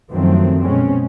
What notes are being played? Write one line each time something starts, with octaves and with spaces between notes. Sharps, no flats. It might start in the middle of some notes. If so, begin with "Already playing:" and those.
F#2 D#3 F3 F#3 A3 C4
B2 G#3 C4 C#4